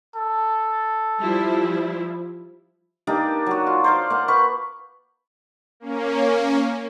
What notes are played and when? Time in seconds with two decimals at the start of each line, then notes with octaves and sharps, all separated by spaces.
0.16 A4
1.22 F3 G3 E4
3.07 A#3 D4 D#4 G4
3.46 F#3 F#4
3.67 F4
3.84 C5 D5 F5
4.10 A#3 F#5
4.28 B4 F#5 C#6
5.80 A#3 C#4